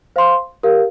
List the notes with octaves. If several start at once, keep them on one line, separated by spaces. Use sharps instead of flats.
C5 F5 C6
G4 A#4 F5